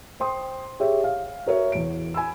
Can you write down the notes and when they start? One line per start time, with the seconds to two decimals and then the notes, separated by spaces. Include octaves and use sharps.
0.20 C5 G5 C6 D#6
0.80 G4 G#4 C#5 E5
1.04 F5
1.46 F#4 A#4 C#5 E5
1.72 E2 D7
2.14 G#5 B5 E6